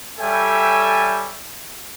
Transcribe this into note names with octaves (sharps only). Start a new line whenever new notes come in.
G3 A4 C#5 E5 G5 G#5